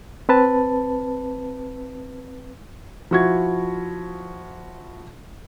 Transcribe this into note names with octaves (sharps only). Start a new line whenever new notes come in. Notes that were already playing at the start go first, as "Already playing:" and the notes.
C4 B4 A5
F3 E4 F#4 C#6 G#6